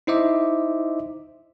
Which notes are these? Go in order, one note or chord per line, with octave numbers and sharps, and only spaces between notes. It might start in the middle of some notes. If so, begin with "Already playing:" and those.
D#4 E4 C5 D#5 E5 D6